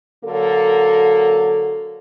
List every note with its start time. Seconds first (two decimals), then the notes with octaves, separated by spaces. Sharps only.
0.25 D3 F#3 A#3 A4